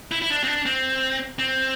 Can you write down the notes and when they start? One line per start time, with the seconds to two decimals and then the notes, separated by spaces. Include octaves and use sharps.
0.12 E4
0.22 E4
0.30 D4
0.44 C4
0.47 D4
0.66 C4
1.39 C4